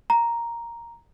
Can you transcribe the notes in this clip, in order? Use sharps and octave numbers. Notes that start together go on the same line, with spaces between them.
A#5